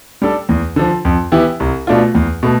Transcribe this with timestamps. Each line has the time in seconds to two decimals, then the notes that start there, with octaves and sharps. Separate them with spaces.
0.22 G3 D4 A4
0.49 E2
0.76 D3 F3
1.05 F2
1.32 E3 B3 E4 G4
1.60 C2
1.87 B2 A3 D4 F4
2.15 E2
2.43 B2 A3